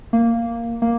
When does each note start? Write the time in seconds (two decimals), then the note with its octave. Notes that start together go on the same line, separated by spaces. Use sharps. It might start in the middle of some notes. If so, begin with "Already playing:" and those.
0.13 A#3
0.82 A#3